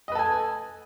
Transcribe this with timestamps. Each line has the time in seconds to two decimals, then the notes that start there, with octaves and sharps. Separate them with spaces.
0.08 D#5
0.12 B4
0.15 A4
0.19 G#5